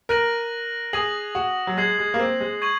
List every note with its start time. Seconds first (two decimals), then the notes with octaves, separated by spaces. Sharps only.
0.09 A#4 F#6 A#6 D#7 F#7
0.93 G#4 D#6 A#6 D#7 F#7
1.35 F#4
1.67 F#3
1.77 G#3 G#6 C7 F#7
1.99 G#3
2.14 A#3
2.19 C4
2.40 G#3
2.62 C#6 G#6 D#7 F#7